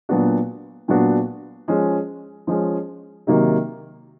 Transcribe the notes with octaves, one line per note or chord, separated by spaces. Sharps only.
A#2 F#3 B3 D4 F#4
A#2 F#3 B3 D4 F#4
F3 G#3 C#4
F3 G#3 C#4
C3 D#3 F#3 A#3